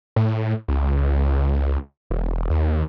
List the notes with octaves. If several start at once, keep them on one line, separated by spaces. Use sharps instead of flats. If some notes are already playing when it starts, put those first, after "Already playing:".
A2
C#2
E1
D#2